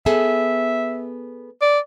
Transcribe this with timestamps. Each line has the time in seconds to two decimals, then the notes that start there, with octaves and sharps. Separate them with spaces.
0.06 B3 G#4 A4 E5
1.62 D5